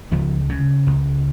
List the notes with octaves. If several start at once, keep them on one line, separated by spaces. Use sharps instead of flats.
C#2 F3
C#3
C#2